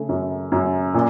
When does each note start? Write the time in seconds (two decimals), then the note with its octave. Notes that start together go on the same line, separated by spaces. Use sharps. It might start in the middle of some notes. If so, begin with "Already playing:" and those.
Already playing: C#3 A3
0.09 F#2
0.52 F#2
0.94 A#2